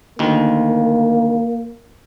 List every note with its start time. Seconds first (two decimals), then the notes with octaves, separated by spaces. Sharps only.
0.19 D2 D#3 A#3